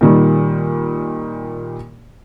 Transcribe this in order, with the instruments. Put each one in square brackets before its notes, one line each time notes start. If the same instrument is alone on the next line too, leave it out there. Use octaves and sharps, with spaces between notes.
[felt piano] A#2 D#3 G3